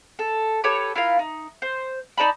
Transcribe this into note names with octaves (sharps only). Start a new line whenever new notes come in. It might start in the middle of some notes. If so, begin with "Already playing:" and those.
A4
G4 A4 B4 C#5
E4 F4 A#4 F5
D#4
C5
D#4 D5 A5 B5